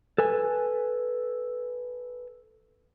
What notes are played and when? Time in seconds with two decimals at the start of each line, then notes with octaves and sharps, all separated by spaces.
0.18 A4 B4 G#5